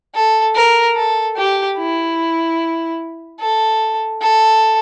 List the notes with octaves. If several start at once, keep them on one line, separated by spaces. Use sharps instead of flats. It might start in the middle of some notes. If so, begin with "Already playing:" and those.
A4
A#4
A4
G4
E4
A4
A4